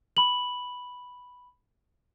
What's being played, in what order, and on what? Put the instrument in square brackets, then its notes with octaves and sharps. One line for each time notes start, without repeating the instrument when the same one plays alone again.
[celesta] B5 F#7